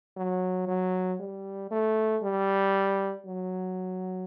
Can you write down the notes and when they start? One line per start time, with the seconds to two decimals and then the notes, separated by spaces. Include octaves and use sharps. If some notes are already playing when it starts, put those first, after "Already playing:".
0.16 F#3
0.67 F#3
1.20 G3
1.71 A3
2.22 G3
3.26 F#3